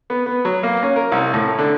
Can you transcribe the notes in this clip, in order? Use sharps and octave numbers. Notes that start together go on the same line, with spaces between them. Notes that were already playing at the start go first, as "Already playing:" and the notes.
B3
B3
F#3
A#3
C#4
A#4
C2
A2
D3